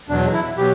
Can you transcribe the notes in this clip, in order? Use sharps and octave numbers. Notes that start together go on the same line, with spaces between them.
E2 B2 F#3 D4
E4
B2 F#3 G4